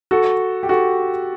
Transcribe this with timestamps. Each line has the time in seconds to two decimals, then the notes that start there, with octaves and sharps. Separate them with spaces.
0.11 F#4 A4
0.63 G4
0.69 F#4 A4